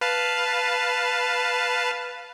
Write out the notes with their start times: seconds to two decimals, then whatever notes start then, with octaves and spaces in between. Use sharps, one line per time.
0.01 B4 F5 A5